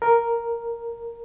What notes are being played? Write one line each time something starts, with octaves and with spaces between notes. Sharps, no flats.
A#4